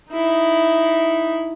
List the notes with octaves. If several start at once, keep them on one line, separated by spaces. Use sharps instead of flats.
D#4 E4